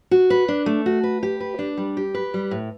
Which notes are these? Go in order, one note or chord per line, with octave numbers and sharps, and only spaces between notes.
F#4
B4
D4
A3
F#4
B4
G4
B4
D4
G3
G4
B4
G3
A2